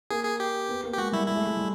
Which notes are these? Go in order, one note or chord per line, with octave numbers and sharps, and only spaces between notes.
A#3 G#4
G#4
G4
B3
A#3
G4
G#3 F#4
G3 E4
G#3 E4
A3
G#3
G3